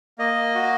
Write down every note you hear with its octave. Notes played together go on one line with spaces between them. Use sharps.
A#3 D#5
F#4